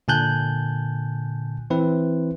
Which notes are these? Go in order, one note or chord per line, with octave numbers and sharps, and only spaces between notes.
A#2 D3 G#5 A5 F#6 G6
E3 C4 E4 B4